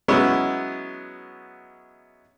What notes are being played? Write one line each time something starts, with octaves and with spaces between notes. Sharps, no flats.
F#3 G#3 B3 C#4 E4